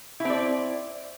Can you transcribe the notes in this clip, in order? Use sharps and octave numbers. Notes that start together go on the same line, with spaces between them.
C4 E4 D5